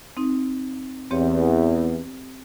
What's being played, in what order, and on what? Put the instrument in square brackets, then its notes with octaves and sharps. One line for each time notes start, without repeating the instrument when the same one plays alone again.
[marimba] C4 D#4
[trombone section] E2 [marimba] C4 G4 C#5